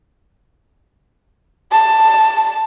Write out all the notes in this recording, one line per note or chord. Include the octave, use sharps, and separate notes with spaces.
A5